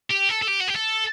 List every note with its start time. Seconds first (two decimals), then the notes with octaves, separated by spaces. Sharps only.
0.11 G4
0.30 A4
0.42 A4
0.48 G4
0.61 F#4
0.68 G4
0.76 A4